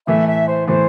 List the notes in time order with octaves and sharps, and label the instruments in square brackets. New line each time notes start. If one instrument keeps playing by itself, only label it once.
[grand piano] A2 E3 A3 [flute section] E5
[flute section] E5
C5
[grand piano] A2 E3 A3 [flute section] C5